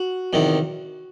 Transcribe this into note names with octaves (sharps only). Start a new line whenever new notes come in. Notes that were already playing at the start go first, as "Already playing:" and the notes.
Already playing: F#4
E2 C3 D#3